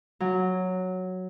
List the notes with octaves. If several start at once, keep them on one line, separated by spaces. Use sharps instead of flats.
F#3